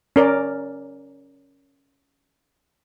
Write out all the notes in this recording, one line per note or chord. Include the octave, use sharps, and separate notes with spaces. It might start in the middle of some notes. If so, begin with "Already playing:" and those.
C#4 A#4 D5